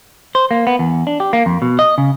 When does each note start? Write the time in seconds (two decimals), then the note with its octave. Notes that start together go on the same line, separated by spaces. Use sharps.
0.35 C5
0.51 A#3
0.67 B3
0.79 E2
1.07 D4
1.20 G4
1.33 A#3
1.46 F2
1.62 B2
1.79 D#5
1.98 C#3